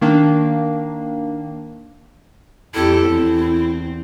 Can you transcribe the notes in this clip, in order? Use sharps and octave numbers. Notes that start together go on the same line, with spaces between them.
D#3 A#3 D4
F2 E4 G4 A4
E2 C4